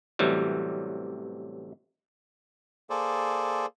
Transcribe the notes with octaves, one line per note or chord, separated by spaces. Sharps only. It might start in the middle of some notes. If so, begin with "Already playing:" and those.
A1 C3 E3 F#3 G3
A#3 G#4 A4 C5 D5